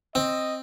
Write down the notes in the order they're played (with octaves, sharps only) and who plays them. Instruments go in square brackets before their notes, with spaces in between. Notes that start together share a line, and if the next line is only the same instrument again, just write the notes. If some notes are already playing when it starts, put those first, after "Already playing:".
[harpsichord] C4 [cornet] D#5